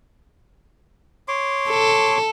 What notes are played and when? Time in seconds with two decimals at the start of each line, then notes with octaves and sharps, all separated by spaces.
1.28 C#5 C6 D6
1.70 A4